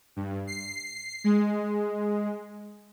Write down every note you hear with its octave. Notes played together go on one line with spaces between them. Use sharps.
G2
C7
G#3